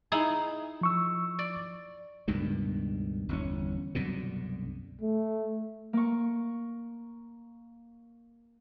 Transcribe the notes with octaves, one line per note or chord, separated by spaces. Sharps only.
D#4 E4 G#4
F3 C#6 E6
D5
C#2 G2 B2 D#3
G1 E2 C4 C#4
C2 F#2 B2 D3
A3
A#3 C#6